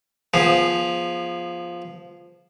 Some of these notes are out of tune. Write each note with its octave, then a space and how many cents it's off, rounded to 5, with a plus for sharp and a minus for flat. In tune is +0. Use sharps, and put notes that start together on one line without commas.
F3 +0 B3 -25 G#4 +0